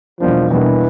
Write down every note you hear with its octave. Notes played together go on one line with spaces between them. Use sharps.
E2 B2 F3 G3 A#3 D4
E2 B2 E3 G3 A#3 D4